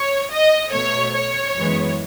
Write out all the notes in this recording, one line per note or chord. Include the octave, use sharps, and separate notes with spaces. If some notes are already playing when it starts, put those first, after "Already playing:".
Already playing: C#5
D#5
B2 A3 C#5
C#5
F#2 E3 G#3 B3